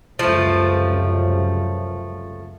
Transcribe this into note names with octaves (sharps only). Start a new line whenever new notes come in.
C#2 F#2 C3 F3 A3